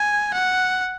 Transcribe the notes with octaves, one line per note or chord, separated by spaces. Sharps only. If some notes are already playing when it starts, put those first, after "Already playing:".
Already playing: G#5
F#5